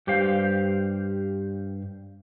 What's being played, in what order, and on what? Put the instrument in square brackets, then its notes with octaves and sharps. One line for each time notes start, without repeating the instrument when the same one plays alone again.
[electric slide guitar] G2 G4 C5 F5